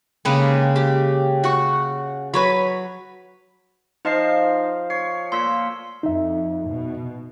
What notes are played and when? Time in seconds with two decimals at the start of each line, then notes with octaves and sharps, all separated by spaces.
0.25 C#3 G#3 A#3 D#4 G4 B4
0.76 G4
1.44 F#4 F#5 C#6
2.34 F#3 B4 C#5 B5
4.05 F3 D#4 C5 D#5 F5 C7
4.90 C#5 C7
5.32 A#2 C6 E6 B6
6.03 F2 D#4 E5
6.67 B2